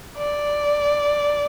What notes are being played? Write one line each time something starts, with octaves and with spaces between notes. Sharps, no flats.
D5